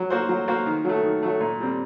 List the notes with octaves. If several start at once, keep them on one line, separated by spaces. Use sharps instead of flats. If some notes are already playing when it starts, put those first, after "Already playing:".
Already playing: F#3
A#3 F#4 C5
F#3
A#3 F#4 C5
D#3
F#3 A3
D#3
F#3 A3
A#2
G3 C4